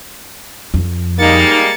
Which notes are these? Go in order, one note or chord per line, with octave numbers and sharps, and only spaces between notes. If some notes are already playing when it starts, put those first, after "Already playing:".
F2
G3 G#3 A#3 D#4 A6 C#7